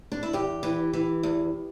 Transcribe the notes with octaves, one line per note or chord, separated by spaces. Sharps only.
D4
E4
E2 G4
E3
E3
E2